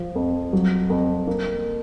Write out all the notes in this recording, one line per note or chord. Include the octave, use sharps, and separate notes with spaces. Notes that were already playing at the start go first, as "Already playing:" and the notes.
Already playing: F3
F2
F#3
F2
A#3